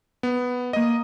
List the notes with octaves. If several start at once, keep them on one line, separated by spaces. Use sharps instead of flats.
B3
A#3 D#5 D#6